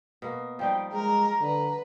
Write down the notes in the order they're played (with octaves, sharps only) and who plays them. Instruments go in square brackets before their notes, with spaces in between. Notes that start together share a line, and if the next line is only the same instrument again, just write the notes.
[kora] B2 A#3
[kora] F3 G3 D#4 [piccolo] G5
[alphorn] G#3 [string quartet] A#4 [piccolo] A#5
[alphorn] D3 [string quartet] B4